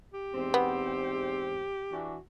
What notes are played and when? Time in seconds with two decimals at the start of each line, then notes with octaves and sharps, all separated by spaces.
0.14 G4
0.35 E2 G#2 C4
0.54 B3
1.92 E3 D4 F#4